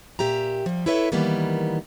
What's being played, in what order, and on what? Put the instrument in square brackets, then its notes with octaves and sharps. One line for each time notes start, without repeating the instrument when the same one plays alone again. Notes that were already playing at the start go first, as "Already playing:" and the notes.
[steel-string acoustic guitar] A#2 G4 E5 A#5
F3 G3
E4 A4 B4 C#5 E5
D#3 E3 G3 A#3 B3